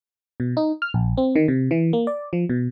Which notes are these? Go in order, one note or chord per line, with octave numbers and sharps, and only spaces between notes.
B2
D#4
F6
A#1
C4
D#3
C3
E3
A#3
D5
F3
B2